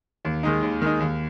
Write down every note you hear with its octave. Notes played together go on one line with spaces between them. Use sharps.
D#2
D#3 G#3 D#4
D#2
D#3 G#3 D#4
D#2